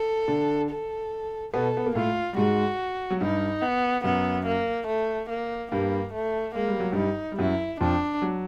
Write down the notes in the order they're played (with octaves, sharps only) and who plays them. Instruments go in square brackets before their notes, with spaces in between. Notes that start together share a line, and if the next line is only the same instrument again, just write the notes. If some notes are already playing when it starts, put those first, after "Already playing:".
Already playing: [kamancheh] A4
[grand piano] D3 D4
[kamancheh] A4
[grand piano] B2 B3 [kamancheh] A4
[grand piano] B3
A#3
[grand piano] A2 A3 [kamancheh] F4
[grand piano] G3
[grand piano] G#2 G#3 [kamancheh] F#4
[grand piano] F#3
[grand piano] G2 G3 [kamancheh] D#4
[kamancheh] B3
[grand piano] F#2 F#3 [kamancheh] B3
[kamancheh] A#3
A3
A#3
[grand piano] G2 G3 [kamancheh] A#3
[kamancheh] A3
[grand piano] G#3 [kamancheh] A#3
[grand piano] G3
F#3
[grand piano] G2 G3 [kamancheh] D#4
[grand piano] G3
[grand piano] F#2 F#3 [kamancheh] E4
[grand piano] F2 F3 [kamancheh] D4
[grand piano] F#3